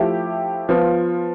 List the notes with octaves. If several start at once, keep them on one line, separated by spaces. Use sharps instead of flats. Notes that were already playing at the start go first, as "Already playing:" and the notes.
Already playing: F3 A3 E4 G4
F3 B3 F4